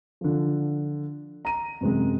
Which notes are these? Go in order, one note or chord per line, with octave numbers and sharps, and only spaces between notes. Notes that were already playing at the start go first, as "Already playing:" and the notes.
D3 F3
A#5 D#7
F#2 C3 G#3